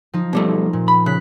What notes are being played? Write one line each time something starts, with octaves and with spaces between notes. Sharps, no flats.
F3 D#4
B2 G3 A3
A#2
B5
C#3 F#6 B6